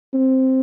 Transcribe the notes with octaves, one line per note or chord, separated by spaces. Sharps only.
C4